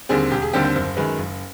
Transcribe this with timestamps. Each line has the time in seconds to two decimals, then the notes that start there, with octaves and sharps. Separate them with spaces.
0.09 D#2 D3 G3 C4 G#4
0.31 E1 G4
0.42 G#4
0.53 D#2 D3 G3 C4 G4
0.65 C5
0.75 F#1 C5
0.97 F#2 D#3 G#3 B4
1.18 F#1